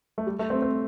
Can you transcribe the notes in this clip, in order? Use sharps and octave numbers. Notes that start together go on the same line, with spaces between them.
A3
G3
A3
C4
C4